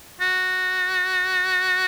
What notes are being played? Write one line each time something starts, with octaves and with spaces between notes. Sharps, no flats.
F#4